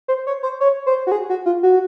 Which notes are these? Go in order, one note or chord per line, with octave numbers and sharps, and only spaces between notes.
C5
C#5
C5
C#5
C5
F#4
G#4
F#4
F4
F#4